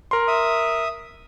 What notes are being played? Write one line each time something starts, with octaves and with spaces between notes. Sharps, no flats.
A#4 C6
E5 D#6